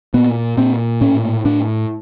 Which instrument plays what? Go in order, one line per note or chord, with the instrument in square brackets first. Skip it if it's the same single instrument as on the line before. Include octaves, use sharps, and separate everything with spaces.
[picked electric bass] A#2 B3
A#2 C4
A2 C#4
A2 D4